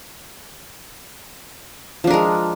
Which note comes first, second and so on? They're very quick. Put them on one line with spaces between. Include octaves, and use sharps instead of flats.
F3 D4 A#4 G#3